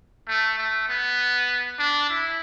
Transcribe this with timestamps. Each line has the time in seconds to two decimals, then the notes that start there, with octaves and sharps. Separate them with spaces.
0.28 A3
0.58 A3
0.88 B3
1.79 D4
2.10 E4